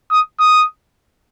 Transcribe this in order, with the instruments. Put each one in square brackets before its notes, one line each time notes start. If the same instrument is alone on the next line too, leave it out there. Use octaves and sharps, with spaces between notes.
[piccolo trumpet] D#6
D#6